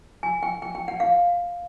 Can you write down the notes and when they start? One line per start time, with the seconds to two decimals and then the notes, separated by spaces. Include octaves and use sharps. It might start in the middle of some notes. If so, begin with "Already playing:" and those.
0.23 G#5
0.43 G5
0.62 G5
0.75 G5
0.88 F#5
1.00 F5